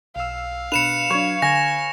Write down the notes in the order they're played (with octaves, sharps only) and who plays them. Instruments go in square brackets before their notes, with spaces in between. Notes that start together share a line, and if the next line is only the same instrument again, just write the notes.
[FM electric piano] B1 E6 [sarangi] F5
[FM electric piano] B2 D4 [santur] B4 [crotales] C#7 E7 F7
[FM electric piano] F#3 D4 [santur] C#5
[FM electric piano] D3 [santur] G#5 [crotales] A#6